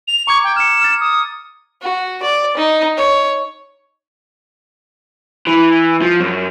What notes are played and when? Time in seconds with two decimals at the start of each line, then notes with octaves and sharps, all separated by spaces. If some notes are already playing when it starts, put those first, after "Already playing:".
0.08 F7
0.27 A#5 C#6 D6 G#6
0.44 G5
0.56 F6 C#7 E7
0.82 F6 A6
1.01 D#6
1.82 F#4
2.23 D5
2.57 D#4
2.97 C#5
5.47 E3
6.02 F3
6.20 F#2